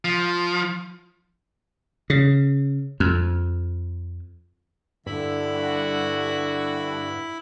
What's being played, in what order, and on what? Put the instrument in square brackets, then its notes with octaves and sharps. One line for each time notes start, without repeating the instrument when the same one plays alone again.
[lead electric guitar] F3
[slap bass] C#3
F2
[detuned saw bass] G2 [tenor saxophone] D3 [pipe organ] E4 B5
[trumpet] F#4